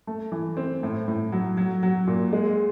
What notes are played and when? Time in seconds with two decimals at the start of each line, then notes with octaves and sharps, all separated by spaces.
0.07 A3
0.32 E3
0.57 C4
0.83 A2
1.08 A2
1.32 F#3
1.57 F#3
1.83 F#3
2.07 A#2
2.33 G#3